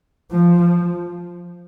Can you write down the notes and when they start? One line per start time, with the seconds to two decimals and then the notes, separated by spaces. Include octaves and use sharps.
0.32 F3